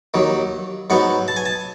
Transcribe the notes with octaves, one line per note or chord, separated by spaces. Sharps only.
D#2 D#3 F#3
G#2 F#3 B3 F#5
A5
G#5
A5